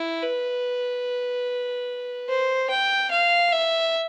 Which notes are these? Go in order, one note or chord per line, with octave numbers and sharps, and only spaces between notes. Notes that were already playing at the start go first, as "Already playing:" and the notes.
Already playing: E4
B4
C5
G5
F5
E5